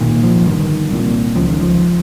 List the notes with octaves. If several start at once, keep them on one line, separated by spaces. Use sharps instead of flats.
C2 A#2 D#3
F3
G1 G2 D#3
C2 A#2
C#2 C#3 F3
D#3
F3